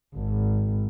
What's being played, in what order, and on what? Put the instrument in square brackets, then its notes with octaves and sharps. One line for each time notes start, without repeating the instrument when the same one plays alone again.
[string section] G#1